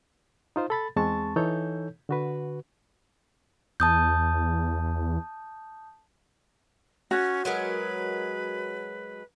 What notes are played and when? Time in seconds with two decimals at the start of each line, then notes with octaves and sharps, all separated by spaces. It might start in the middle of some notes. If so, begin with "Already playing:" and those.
0.56 D#4 F4 C5
0.70 A4 B5 A6
0.96 E2 G#3 C4 A5 C#6 A6
1.36 E3 D#4 A4 C#5 G6
2.09 D3 F#4 B4
3.80 E2 A5 D#6 G6
7.11 C#4 F#4
7.45 F#3 G#3 A#4 B4